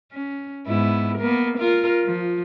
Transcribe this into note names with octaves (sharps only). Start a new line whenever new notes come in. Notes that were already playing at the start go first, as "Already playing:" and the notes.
C#4
G#2 B3 E4
A#3 B3 A#4
F4 A#4
F3